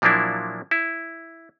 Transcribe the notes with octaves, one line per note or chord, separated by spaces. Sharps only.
A#2 F3 F#3 A#3 D4 E4
E4